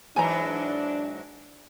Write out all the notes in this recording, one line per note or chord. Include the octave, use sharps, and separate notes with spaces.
G#2 E3 F#3 D4 G#5 A#5